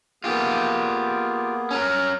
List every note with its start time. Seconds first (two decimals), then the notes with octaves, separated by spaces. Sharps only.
0.24 A#3 B3 F4 G4 G#4
1.71 C#4 A#4